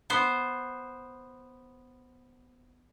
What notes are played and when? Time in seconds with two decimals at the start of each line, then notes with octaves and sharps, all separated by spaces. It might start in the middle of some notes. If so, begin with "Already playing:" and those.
0.10 B3 C5